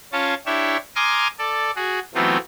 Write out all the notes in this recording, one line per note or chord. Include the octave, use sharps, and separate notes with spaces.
C#4 F4 C#5 F5 A5
D4 E4 G4 C#5 E5
G#5 A#5 C6 D6 D#6 F6
A4 D5
F#4 G#4
E3 F#3 A3 B3 C4 F4